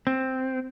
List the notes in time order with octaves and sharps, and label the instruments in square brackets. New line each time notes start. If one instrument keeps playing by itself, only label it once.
[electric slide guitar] C4